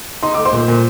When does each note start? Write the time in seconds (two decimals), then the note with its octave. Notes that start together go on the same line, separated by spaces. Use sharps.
0.23 D#4 C6
0.34 A3 D6
0.45 C5 C6
0.53 A#2
0.68 A#2